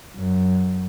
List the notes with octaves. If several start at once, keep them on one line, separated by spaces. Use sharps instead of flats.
F#2